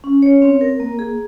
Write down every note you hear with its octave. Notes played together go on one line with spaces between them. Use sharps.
C#4
C#5
C4
A#4
A#3
G#4